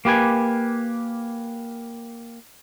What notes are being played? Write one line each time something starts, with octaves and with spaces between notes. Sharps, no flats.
A#3 G4 B4 G#5